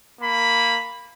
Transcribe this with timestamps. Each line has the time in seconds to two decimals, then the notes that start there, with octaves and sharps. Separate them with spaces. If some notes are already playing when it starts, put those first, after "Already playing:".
0.21 A#3 B5